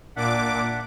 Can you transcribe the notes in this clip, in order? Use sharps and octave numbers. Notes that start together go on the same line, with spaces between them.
A#2 D4 E5 F#5 D6